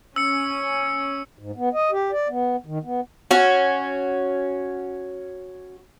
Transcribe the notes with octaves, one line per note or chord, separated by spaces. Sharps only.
C#4 E6 C#7
G#2
B3
D#5
G4
D5
B3
D#3
B3
C#4 F#4